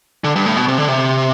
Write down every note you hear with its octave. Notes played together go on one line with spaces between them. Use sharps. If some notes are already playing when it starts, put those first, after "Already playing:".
D3
G2
A2
B2
C3
D3
C3